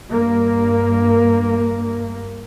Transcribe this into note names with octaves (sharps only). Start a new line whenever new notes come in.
G2 A#3